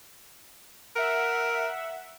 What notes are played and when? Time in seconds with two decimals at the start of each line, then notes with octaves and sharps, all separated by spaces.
0.96 A#4 E5 F#5